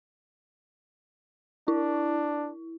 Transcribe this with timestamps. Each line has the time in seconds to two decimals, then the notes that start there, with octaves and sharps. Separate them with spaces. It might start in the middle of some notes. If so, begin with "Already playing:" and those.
1.68 D4 E4